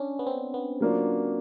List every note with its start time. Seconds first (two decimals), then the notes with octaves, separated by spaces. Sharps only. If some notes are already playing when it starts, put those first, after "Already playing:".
Already playing: C#4 D4
0.19 B3
0.27 C4
0.54 B3
0.80 F#3 A#3 D4 F4